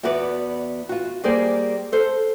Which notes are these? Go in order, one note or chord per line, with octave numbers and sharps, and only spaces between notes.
E2 B3 F#4 B4 D5
F4 F#4
G3 A#3 G#4 C5 D5
A4 C5